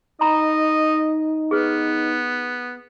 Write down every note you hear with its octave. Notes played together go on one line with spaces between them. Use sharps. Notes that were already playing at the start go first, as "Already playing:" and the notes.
D#4 D#5 A#5 B5
B3 G#4 B4